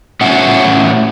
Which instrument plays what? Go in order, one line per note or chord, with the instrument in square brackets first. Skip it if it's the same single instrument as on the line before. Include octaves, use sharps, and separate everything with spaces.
[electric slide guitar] A2 C#4 E5 F#5